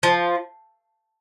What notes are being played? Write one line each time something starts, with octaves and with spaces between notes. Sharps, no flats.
F3